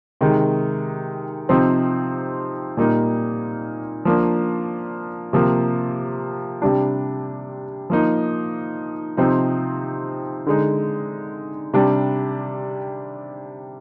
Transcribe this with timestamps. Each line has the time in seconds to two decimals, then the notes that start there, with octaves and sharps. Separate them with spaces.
0.21 C3 D#3 G#3 D#4
1.49 C3 F3 C4 D#4
2.77 A#2 G3 A#3 D#4
4.05 F3 A#3 D4
5.33 C3 F3 A#3
6.62 C3 G3 D4
7.90 F3 A#3 D#4
9.17 C3 F3 C4 D#4
10.46 D3 G#3 D#4
11.74 C3 G3 D4